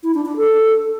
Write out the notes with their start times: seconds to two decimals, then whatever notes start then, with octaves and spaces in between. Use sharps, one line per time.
0.03 E4
0.14 D4
0.26 D4
0.37 A4